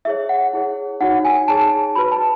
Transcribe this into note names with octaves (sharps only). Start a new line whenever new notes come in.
E4 G#4 C#5 E5
F#5
E4 G#4 C#5
D#4 F#4 C#5 F#5
G#5
D#4 G#4 C#5 A5
F#4 B4 B5
A5